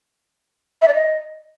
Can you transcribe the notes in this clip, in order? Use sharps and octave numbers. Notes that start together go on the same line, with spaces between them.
E5
D5
D#5